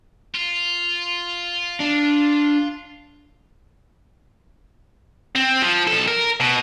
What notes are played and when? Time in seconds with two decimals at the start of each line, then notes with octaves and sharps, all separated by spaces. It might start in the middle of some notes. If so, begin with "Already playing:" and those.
0.35 F4
1.80 D4
5.36 C4
5.62 F3
5.87 B1 A4
6.08 A#4
6.40 B2